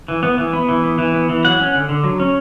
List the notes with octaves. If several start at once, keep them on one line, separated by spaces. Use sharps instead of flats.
E3
B3
E3
B3
E3
B3
E3
B3
E3
F#3 F#5
C#4
D3
D3
F#3
C#4